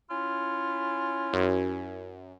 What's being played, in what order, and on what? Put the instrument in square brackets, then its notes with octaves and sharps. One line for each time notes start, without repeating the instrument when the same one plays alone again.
[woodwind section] C#4 E4 [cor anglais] F4
[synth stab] F#2